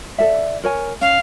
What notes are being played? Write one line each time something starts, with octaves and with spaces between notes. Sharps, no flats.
A4 D5 E5
A#4 C#5 G#5
C#4 F5